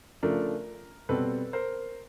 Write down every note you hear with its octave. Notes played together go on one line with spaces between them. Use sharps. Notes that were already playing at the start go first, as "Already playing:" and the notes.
C#3 F3 A3 D4 A#4
B2 G3 C4 A4 B4
A#4 C5